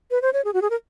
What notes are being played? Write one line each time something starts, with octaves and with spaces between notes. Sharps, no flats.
B4
C5
C#5
G#4
F#4
G#4
A#4